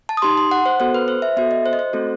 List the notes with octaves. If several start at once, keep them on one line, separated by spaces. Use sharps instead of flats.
A5
D#6
D#4 G4 C6
C6
F#5
C5
B3 F#4 A4 C5
B4
C5
E5
B3 F#4 A4 E5
D#5
C5
D#5
C5
A3 C4 F#4 A4